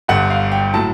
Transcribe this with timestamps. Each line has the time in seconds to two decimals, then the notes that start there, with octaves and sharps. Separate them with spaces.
0.08 G1 G2 D3 F#5
0.30 F5
0.52 G5
0.74 A2 F#3 A5